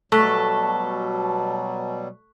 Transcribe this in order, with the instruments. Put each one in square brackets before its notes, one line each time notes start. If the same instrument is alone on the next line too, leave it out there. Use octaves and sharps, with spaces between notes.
[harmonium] B2 F#3 G3 [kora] A3 [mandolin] A4 [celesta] C#6 F#6 B6